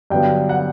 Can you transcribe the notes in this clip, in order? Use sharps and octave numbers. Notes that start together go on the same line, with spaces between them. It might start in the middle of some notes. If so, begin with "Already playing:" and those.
G2 D3 F#3 B3 G5
F#5